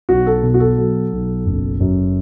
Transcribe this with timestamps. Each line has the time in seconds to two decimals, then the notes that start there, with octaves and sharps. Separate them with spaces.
0.09 B1 F#4
0.26 A4
0.43 B2
0.54 F#4
0.60 A4
0.78 F#3
1.12 B1
1.46 F#1
1.80 F#2